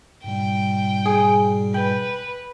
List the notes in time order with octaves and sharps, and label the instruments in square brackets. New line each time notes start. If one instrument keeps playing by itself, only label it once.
[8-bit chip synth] G#2 B2 G3 [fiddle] G5
[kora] G#4
[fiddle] B4 [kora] G5